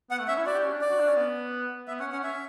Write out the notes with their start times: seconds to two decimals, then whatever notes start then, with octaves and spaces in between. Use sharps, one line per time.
0.10 B3 F#5
0.20 A3
0.28 C#4 E5
0.38 E4
0.46 F#4 D5
0.55 G4
0.64 C#4
0.73 D4
0.81 D5
0.90 F#4
0.99 D4
1.08 C#4
1.17 B3
1.88 B3 E5
2.00 C#4 F#5
2.12 C#4 F#5
2.23 C#4 E5